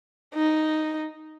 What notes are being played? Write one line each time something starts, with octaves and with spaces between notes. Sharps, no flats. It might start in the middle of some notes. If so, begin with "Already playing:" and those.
D#4